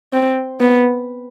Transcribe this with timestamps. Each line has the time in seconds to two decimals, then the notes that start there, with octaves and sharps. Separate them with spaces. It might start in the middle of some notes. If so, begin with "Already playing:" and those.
0.13 C4
0.61 B3